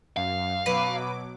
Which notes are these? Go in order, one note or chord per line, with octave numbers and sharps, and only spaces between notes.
F#2 F5
B2 F#3 B4 D6